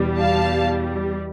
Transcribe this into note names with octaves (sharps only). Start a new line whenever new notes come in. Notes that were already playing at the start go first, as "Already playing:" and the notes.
Already playing: E2 B2 G3
F5 A5